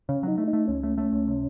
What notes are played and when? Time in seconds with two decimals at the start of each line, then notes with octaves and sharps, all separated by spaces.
0.09 C#3 C#4
0.23 F#3 D#4
0.38 A3
0.48 D#4
0.53 A3
0.68 C#2 C#4
0.83 A3
0.98 A3
1.12 C#2
1.28 C3